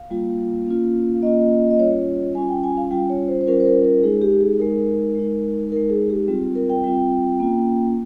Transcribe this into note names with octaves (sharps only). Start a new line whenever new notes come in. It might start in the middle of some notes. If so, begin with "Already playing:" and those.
Already playing: F5
G3 A#3 F4
A#3 C#4 F4
A#3 C#4 F4 D#5
D#5
G3 C#4 F4 C#5
G3 C#4 F4 G#5
G5
G#5
F5
G3 C#4 F4 G5
C#5
C5
C5
G3 C#4 F4 A#4
C5
A#4
A#4
G#3 D#4 G#4
G4
G#4
G#3 D#4 A#4
G#3 D#4
G#3 D#4 A#4
G#4
G4
G3 C4 F4
A#4
G5
G3 C4 F4 G5
A#3 C#4 F4